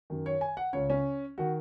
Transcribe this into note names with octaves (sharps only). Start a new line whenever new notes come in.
F#2 D#3
C#5
G#5
F#5
C#2 C#3 C#5
C#4
D#3 F#4